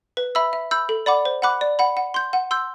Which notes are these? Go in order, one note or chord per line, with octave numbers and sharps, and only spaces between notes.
B4
E5 B5 E6
E5
B5 E6 G6
A4
D5 F#5 B5 D6
C5
F#5 B5 D6 F#6
D5
F#5 B5
F#5
C6 G6
F#5
C6 E6 G6